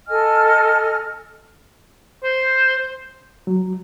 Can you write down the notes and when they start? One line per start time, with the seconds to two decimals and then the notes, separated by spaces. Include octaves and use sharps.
0.08 A4 D#5 G#5 F6
2.24 C5
3.47 F#3